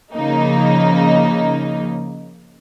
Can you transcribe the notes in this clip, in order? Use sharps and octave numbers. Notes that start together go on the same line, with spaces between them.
C#3 F3 A#3 D#4